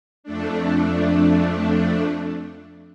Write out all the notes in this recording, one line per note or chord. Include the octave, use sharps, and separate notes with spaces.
F2 A3 D4